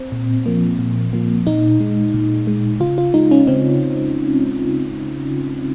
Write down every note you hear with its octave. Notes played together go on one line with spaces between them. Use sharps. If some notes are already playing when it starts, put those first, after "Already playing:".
Already playing: C4
A#2
F3 A#3
A#2
F3 A#3
A#2 D#4
G#3
A#2
G#3
C#3 F4
F4
G#3 D#4
C#4
C#3 C4